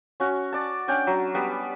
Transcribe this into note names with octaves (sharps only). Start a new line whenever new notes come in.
C#4 F#4
D5 A5
C#4 D4 G5
F#3
G3 B3